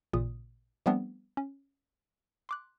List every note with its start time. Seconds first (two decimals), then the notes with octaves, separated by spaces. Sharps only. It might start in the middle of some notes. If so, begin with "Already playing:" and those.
0.13 A1 A#2 C#3 D#6
0.86 F3 G3 A3 B3 C4 D4
1.37 C#4
2.49 C6 D6 F#6